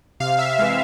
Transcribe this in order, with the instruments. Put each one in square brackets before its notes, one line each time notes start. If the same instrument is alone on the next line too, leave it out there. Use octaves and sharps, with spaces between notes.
[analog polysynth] C3 F5
E5
E3 G#3 F5